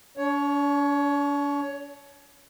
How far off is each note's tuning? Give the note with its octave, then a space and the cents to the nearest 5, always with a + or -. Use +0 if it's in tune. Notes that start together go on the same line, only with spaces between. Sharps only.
D4 -45 C#5 +15